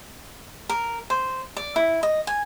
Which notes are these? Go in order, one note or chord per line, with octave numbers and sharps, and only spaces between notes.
A#4
C5
D5
E4
D#5
G#5